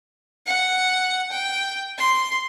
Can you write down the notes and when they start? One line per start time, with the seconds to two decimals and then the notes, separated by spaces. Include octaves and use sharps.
0.46 F#5
1.32 G5
1.98 C6